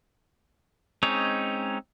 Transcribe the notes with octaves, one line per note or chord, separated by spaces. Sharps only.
G#3 C4 C#4 D#4 C#5